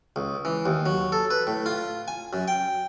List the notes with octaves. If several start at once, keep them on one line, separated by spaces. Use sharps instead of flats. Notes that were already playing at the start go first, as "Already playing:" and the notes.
C#2
E3
D#2
F#3
A4
B4
A2
F4
G#5
F#2
G5